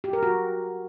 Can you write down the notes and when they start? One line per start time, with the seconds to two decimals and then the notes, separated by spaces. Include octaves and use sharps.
0.04 G4
0.13 A#4
0.23 F#4